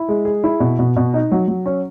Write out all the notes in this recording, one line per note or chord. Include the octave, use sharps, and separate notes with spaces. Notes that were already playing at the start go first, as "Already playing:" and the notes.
Already playing: E4
G#3
G#4
E4
B2
B2
B2
D#4
F#3
F#3
C#4